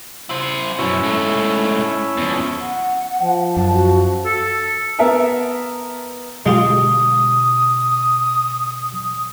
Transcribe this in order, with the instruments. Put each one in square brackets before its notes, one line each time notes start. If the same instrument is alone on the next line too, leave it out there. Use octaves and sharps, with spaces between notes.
[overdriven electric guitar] E4 C5
[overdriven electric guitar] F#2 B2 [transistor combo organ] C#4 E4
[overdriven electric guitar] G#2 A3
E2 F3
[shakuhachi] F#5
[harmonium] F3
[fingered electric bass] F#2 [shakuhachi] A5
[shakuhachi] F#4
[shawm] A4
[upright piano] B3 A#4 E5 A5
[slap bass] B2 D3 [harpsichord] G#3 F4 G4 [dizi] D#6